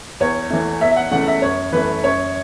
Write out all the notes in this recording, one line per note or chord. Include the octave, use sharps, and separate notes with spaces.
E2 C#5
E3 A3
E2 E5
E5
F#5
C#3 E3 A3 F#5
E5
F#2 C#5
E3 A3 B4
F#2 C#5